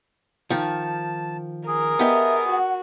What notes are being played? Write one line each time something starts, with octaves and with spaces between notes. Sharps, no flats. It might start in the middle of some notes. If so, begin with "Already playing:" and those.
D#3 F3 A5
G#4 A#4
B3 G4 D#5 E5
F#4 F#5